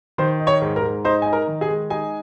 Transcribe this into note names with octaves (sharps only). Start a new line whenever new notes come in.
D#3 C5 C6
D#4
C#5 C#6
G#2
A#4 A#5
G#2
D#4 C5 C6
D#4 G#5
A#4 A#5
D#3
G#4 G#5
G#3
D#4 G#4 G#5